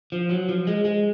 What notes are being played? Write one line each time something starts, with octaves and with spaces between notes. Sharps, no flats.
F3
F#3
F3
G#3
G#3